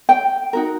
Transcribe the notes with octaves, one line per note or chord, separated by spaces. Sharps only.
G5
D#4 F#4 A#4